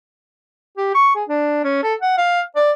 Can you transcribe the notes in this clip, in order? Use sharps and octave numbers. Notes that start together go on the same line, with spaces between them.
G4
C#6
G#4
D4
C#4
A4
F#5
F5
D5